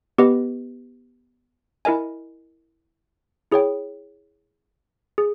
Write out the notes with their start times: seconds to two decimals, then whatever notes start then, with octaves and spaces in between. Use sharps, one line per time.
0.18 B3 G4 B4 D#5
1.85 E4 A#4 D#5 G#5
3.52 E4 G#4 C#5 G5
5.18 G#4